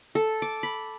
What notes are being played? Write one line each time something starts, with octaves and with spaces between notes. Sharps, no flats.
A4
D6
B5